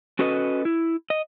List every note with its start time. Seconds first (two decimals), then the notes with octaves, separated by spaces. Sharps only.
0.19 C#4 F#4 A4 B4 D#5
0.65 E4
1.10 D#5